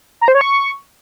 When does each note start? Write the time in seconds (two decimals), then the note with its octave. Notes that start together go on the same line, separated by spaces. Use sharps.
0.21 A#5
0.28 C5
0.35 C#5
0.41 C#6